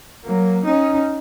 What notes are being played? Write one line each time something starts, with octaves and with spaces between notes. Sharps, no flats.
F#3 A#3
C#4 D#4